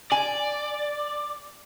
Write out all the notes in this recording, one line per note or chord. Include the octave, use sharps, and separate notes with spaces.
D5 G#5